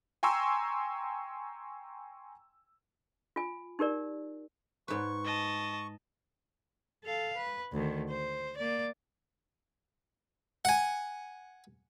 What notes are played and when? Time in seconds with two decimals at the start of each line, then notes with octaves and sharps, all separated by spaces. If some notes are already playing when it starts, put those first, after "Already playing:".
0.23 G5 G#5 A#5 C6 C#6 E6
3.36 F4 G#5
3.79 D#4 G4 A#4 D5
4.88 G#2 B4 C#6
5.25 D#5 A5
7.04 A4 F5
7.37 B4
7.73 D2 D#3
8.10 C5
8.57 A#3 D5
10.65 F#5 G#5